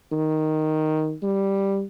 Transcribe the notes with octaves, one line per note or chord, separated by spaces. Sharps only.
D#3
G3